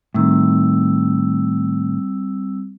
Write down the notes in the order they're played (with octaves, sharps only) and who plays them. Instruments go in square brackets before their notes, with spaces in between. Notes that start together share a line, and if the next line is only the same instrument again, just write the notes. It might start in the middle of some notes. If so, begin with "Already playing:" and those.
[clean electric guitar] A2 D#3 [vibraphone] G3 C4 E6